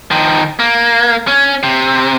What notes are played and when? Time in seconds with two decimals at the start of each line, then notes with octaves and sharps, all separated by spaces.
0.11 D#3 F3
0.59 A#3
1.27 C#4
1.63 C3